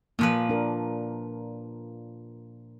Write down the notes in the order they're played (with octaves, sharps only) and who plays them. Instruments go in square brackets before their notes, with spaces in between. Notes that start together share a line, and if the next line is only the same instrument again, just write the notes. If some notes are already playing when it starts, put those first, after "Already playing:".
[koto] A#2 F3 B4 [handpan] A#3
[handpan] D4 A#4